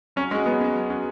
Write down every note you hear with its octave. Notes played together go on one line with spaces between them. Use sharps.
F#3 C#4
G#3 C#4 F#4
F#3 B3
C#4 F#4
F#3
C#4 F#4